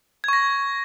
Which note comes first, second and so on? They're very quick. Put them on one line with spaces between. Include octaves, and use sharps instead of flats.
G#6 C#6 A#6